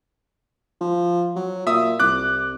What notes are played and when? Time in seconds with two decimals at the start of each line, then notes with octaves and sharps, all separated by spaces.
0.81 F3
1.36 F#3
1.67 A#2 E5 D#6
2.00 C2 D6 F#6